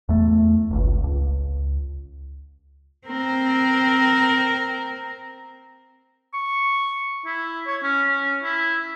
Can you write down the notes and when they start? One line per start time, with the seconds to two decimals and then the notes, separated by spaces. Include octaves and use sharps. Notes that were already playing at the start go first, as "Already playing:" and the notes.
0.09 E2 A3
0.71 D1 G1 C#2
1.04 C#2
3.08 C4 A#4
6.34 C#6
7.26 E4
7.67 C#5
7.83 C#4
8.08 C#4
8.43 E4